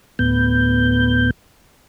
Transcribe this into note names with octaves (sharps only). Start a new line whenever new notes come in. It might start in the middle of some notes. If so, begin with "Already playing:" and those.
D2 A2 B3 G6